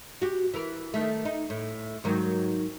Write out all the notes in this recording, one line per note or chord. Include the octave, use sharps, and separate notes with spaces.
F#4 G4
E3 A#4
D#3 A3
D#4
A2
G#2 D#3 F#3